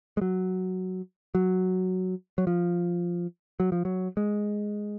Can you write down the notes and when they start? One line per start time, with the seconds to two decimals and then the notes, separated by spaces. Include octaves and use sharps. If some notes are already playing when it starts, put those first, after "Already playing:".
0.17 G#3
0.21 F#3
1.35 F#3
2.38 F#3
2.47 F3
3.60 F#3
3.72 F3
3.85 F#3
4.17 G#3